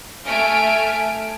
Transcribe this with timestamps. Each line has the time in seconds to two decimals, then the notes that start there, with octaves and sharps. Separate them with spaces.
0.25 A3 E5 G#5 F6 D7